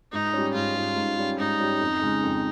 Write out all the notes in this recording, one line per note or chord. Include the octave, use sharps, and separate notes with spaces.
G#2 D#4
G3 C#4
G#2 F4
G3 C#4
G#2
G3 C#4
G#2 D#4
G3 C#4
F2
C#3 G#3
F2